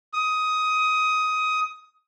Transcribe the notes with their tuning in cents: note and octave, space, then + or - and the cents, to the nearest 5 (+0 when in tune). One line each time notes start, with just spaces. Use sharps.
D#6 +15